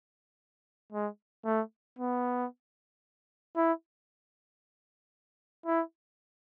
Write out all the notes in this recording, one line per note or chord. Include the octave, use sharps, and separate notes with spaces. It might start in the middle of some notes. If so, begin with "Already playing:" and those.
G#3
A3
B3
E4
E4